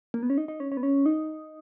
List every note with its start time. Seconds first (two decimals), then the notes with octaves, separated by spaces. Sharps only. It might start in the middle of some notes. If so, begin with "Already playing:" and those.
0.14 A#3
0.23 B3
0.30 C#4
0.38 D#4
0.48 D#4
0.60 C#4
0.72 C#4
0.77 B3
0.83 C#4
1.06 D#4